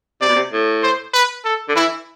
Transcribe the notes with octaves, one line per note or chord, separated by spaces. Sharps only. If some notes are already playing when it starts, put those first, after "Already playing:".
C3 D5
B2
C3
A2
C5
B4
A4
D3
E3 E4